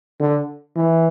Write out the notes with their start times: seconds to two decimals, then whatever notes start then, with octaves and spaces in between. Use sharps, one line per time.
0.19 D3
0.76 E3